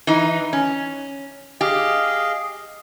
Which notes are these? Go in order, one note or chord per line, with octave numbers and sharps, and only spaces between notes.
E3 D#4
C#4
G4 G#4 D#5 F5